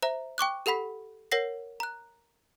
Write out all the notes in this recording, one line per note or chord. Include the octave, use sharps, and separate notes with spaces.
C5 E5 A#5
G5 C#6 D6 F#6
G4 A4 F#5 B5 B6
A#4 C#5 F#5 A#6 C7
A#5 F#6